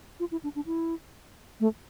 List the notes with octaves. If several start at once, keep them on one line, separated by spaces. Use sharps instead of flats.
F4
E4
D4
D4
E4
A3